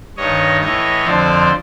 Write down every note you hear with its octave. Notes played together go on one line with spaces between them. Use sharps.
G2 D#3 C#5 D#5
A2 E3 C#5 D#5
F2 D3 F3 C5 D5